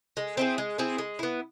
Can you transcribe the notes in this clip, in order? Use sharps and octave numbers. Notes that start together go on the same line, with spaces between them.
G#3
C4 E4 G#4
G#3
C4 E4 G#4
G#3
B3 E4